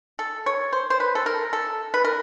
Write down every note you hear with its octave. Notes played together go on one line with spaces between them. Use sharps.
A4
C#5
C5
C5
B4
A4
A#4
A4
B4
A#4